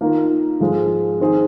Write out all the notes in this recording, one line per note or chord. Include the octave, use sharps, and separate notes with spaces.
D#3 A#3 F4 A#4
G#2 F3 G#3
D#3 C4 G#4